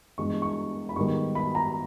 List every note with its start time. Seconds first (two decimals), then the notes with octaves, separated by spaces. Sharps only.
0.18 G2 E3 G#3 B3 C#6
0.42 C#6
0.89 B5
0.96 G#2 D#3 G3 B3 C#6
1.35 B5
1.55 A#5